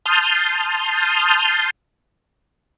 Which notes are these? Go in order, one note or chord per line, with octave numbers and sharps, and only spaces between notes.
A5 C6 D#6 F6 G6